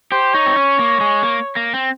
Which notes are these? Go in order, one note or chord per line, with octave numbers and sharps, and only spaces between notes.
G4 C5
D#4 C#5
C4
C#4
A#3
G#3
A#3
A#3
C4